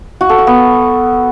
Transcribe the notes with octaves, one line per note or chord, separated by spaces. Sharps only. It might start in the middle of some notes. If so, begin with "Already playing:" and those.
F#4
A4
F#4
B3